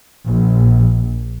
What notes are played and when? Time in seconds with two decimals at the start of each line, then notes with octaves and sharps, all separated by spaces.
0.27 A#1